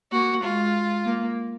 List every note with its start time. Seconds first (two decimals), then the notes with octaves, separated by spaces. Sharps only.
0.12 A#3 F#4
0.44 G#3 F4
1.05 A#3